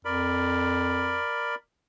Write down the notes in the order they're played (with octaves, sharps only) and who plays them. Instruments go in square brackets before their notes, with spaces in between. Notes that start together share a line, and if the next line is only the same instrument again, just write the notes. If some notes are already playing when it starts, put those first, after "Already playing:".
[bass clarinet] F2 [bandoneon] A#4 D5 B5